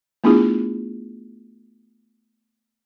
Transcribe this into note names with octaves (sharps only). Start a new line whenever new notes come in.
A3 B3 D4 E4 F4 G#4